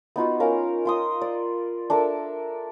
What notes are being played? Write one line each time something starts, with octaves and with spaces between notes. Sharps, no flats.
B3 D#4 F4 F#4
C#4 A#4 F5
F4 C6 D#6
D5
D4 A4 A#4 E5